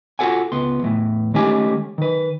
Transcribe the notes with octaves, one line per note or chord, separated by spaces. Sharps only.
F4 F#4 G#4 A4 F#5 G#5
C#2 B3 C6
E2 A2 E3
D#3 G#3 A3 C#4 G4 G#5
D#3 B4